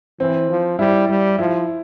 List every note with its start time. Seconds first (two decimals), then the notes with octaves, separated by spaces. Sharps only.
0.20 E3 C4
0.50 F3
0.79 G3 E4
1.09 G3
1.39 F3 E4